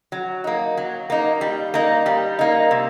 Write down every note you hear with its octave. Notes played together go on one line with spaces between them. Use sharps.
F#3
A#3 D#4
F#3
A#3 D#4
G3
A#3 D#4
G3
A#3 D#4
C3